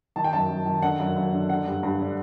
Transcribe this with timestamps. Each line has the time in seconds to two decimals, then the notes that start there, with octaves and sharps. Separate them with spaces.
0.16 D#3 A5
0.24 G5
0.33 F#2 A5
0.49 F#2
0.66 D#3
0.82 D3 F#5
0.99 F#2
1.16 F#2
1.33 D3
1.49 D3 F#5
1.66 G2
1.83 G2
2.00 D3